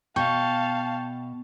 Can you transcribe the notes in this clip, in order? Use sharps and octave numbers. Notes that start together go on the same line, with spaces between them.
B2 F5 G5 A5 C#6 G6